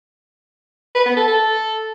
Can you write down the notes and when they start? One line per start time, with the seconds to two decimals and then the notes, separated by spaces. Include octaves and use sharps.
0.95 B4
1.06 B3
1.17 A4
1.28 A4